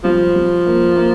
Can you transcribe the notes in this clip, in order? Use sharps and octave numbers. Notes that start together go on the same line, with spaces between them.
F3 G3
G3
A#3
A#3